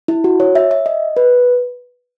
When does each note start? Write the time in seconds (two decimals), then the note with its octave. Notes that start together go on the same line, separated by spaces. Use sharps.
0.08 E4
0.24 F#4
0.40 C#5
0.55 E5
0.71 E5
0.86 D#5
1.17 B4